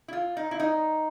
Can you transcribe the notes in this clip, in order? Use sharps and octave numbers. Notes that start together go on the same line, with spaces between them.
E4
F4
D#4
E4
D#4